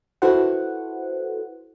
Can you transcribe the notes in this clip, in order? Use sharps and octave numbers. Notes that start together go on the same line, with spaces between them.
E4 F#4 A4 B4 C5 F#5